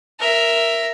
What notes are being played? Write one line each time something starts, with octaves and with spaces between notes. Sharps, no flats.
A#4 E5